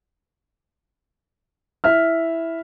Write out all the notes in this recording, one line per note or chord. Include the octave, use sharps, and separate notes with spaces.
E4 E5 F6